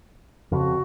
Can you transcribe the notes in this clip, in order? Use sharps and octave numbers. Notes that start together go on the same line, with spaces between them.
F2 C#3 F#4